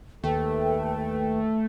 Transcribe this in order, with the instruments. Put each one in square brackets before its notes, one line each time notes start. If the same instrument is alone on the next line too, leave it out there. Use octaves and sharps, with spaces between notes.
[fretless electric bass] D#2 [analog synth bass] A3 [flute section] A4 B4 G5